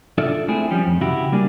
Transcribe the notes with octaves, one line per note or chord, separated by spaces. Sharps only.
D4 F4 A4 D5 E5
G#3 A3 C4 E4 G#4
F3 G3 C#4
F2
C#3 E4 F#4 G4
G3 A#3 D4 G#4